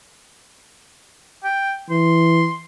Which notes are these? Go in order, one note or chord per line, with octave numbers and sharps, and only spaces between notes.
G5
E3 C6